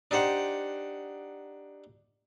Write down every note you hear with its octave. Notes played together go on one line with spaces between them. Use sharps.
D4 D#4 G4 C5 F#5